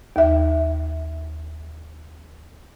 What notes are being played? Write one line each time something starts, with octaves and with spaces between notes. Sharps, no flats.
D#2 E5